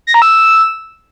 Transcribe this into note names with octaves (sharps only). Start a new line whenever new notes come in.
A#6
A#5
E6